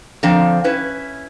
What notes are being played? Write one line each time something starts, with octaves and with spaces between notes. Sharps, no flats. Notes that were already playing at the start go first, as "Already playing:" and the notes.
D3 F3 C4 F5 A#5
C#4 E4 B4